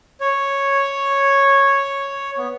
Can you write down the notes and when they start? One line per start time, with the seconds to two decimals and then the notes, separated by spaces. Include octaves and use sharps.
0.21 C#5
2.38 B3